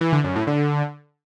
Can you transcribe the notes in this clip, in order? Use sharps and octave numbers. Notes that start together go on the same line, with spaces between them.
E3
D3
F#2
A2
D3